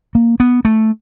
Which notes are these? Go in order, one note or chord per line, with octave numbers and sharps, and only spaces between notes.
A#3
B3
A3